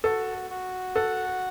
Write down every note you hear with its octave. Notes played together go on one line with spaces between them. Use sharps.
F#4 A4
F#4
A4 F#5